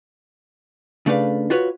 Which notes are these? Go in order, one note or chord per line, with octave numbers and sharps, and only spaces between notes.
C#3 A3 D4 B4 F5
F4 F#4 B4 C#5